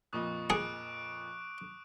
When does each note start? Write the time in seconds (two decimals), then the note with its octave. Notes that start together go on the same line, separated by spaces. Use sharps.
0.13 F2 A#2 D#5 C#6 D#6 F#6
0.50 G#4 D6 F#6 D7